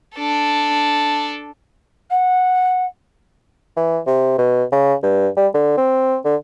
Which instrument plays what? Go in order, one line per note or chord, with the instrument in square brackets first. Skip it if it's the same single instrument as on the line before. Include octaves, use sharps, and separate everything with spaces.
[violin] D4 A4
[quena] F#5
[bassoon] E3
C3
B2
C#3
G2
G3
D3
C4
D3